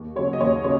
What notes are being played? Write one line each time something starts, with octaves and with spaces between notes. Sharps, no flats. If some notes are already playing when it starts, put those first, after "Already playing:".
Already playing: D#2
C#3 F#3 C#5
D#5
D#2 C#5
C#3 C#5